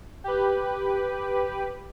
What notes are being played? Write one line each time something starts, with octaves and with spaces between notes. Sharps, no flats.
G4 B4